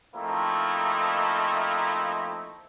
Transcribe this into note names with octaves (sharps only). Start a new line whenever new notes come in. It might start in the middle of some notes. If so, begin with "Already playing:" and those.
F3 A3 A#3 C4 D#4 E4